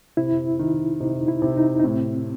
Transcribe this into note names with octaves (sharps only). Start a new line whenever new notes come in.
C3 E4
D#3
C3 D#4
E4
C3
D#4
D#4
A2 C4